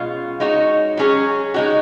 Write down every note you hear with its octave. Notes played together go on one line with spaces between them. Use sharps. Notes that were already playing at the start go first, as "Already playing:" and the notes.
Already playing: B2 G#3 C#4 F4
G#3 D#4 F#4 C#5
F#3 C#4 G#4 C#5
G#3 D#4 F#4